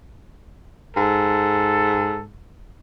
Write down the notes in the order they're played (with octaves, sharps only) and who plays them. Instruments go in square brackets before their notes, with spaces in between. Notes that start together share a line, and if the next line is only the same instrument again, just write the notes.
[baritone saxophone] G#2 [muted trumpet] A4